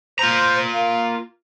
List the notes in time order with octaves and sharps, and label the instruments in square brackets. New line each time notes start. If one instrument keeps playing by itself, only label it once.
[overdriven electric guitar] F4 A#5 [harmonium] C5
[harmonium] A#3